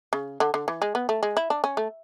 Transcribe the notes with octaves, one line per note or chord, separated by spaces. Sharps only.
C#3
D3
D3
E3
G#3
B3
A3
G#3
E4
D4
C#4
A3